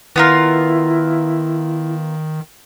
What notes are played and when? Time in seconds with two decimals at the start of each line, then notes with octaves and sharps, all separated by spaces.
0.16 D#3 B3 E4 F4 A#4